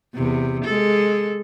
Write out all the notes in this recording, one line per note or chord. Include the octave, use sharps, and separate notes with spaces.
E2 C3
G#3 A4